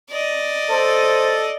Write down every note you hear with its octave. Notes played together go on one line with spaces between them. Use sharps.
D5 D#5
A4 C5